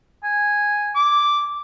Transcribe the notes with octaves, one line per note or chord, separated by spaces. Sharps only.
G#5
D6